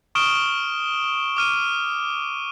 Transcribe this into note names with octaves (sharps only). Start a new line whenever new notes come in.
C#6 D#6 F6 D7 E7 G7
D6 F6 D#7